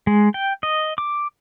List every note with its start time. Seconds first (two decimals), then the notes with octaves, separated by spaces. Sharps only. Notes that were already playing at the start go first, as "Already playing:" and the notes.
0.07 G#3
0.34 G5
0.63 D#5
0.98 D6